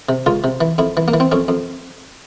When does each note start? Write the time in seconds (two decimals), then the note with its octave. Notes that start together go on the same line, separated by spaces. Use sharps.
0.09 C3
0.26 C#2 F4
0.44 C3
0.61 E3
0.78 F2 E4
0.97 E3
1.08 A#3
1.14 E3
1.20 C4
1.32 F2 C#4
1.48 F2